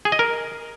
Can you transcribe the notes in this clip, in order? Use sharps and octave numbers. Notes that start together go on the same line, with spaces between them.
G#4
D#5
A#4